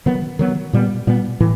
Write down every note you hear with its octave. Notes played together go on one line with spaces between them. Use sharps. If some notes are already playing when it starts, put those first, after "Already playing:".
D#3 F#3 B3
D#3 F#3 B3
A#2 G3 B3
A#2 G3 B3
A2 E3